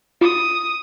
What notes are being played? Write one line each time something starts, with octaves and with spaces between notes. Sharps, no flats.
F4 D#6